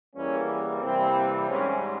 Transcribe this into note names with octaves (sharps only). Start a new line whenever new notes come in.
E2 E3 G3 A#3 C#4
C2 C3 E3 G3 A#3 C4
G#2 G3 C4 C#4